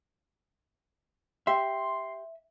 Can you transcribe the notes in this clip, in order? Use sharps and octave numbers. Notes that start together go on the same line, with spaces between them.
G4 E5 C6